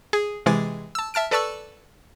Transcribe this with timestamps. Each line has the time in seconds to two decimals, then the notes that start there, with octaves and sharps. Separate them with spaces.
0.13 G#4
0.46 C3 E3 G#3 G#4 D6 A6
0.95 A5 E6
1.14 E5 A5 F6 D7
1.31 A4 B4 D5 A5 C#6 E6